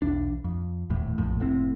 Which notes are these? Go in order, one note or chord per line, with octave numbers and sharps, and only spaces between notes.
B1 E2 D4
F2
D#1 E2 A2
A#1 F2 A2
F1 A2 C4